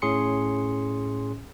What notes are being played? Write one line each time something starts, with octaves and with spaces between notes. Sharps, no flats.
A2 C#4 G#4 C6 C#7